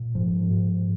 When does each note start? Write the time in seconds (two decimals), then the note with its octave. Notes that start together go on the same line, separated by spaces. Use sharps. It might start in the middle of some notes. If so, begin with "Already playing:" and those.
Already playing: A#2
0.15 G#2 F3
0.51 G#2